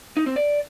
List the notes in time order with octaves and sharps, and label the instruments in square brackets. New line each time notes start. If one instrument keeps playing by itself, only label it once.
[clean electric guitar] D#4
C4
D5